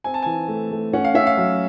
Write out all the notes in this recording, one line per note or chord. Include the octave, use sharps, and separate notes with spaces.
C4 G#5
A5
E3 G#5
A3
A3
C#4 F#5
F5
C#4 E5
F5
F#3